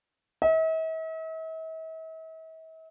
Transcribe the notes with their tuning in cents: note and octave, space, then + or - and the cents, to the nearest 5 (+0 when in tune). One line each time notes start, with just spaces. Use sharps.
E5 -45